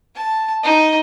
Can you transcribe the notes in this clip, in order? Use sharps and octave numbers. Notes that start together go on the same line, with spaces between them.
A5
D#4